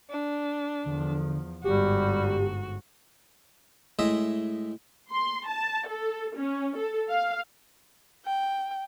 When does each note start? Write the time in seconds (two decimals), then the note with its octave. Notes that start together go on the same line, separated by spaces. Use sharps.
0.10 D4
0.86 E2 D3 F3
1.64 G1 G#2 G3 F#4 G4
3.99 A2 G#3 D#5 E5
5.10 C6
5.47 A5
5.87 A4
6.37 C#4
6.77 A4
7.09 F5
8.25 G5